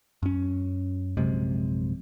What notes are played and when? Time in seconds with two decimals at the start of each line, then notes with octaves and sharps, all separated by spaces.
0.23 F#2 C#4
1.17 A#1 F#2 C3 G#3